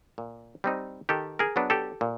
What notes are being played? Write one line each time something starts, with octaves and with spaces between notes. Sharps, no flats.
A#2
G3 C4 D#4
D#3 G4 A4
G#4 A#4
F#3 B3 D4
G4 A4
A#2